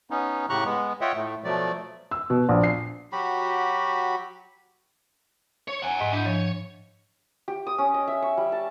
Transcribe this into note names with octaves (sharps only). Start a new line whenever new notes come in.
B3 C#4 D#4
A2 C#3 G4 A#5 C#6 F#6
G#3 B3
F4 C#5 D#5 E5 F#5 G5
A2 A3
B2 F3 F#3 A3 D5
E6
B2
A#1
C7
F#3 F#4 G4 B5
C#5
F#5 G#5
G#2 D#5
D4 E4 D#5 F#5 G6
F3 C#5
G4
D#6
C#4
D#5
E5
C#6
G3
A5